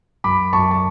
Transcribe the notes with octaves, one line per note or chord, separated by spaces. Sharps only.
F#2 B5 D6
F#2 A5 C#6
A5